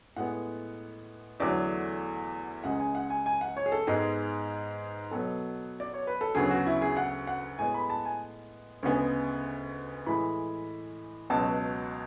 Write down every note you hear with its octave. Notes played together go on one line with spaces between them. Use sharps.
A2 G#3 B3 F#5
E2 D3 F#3 A3 D5
C#2 C#3 G#3 F#5
G#5
F#5
G#5
G#5
F#5
C#5
G#4
A4
G#2 G#3 B3 G#4
B2 F#3 B3 A4
D5
C#5
B4
A4
D2 C#3 F#3 B3 G#4
F#4
E4
G#4
F#5
F#5
A2 G#3 B3 G#5
B5
A5
G#5
D2 C#3 G#3 B3
A2 E3 G#3 B5
C#2 B2 F#3 B3 A5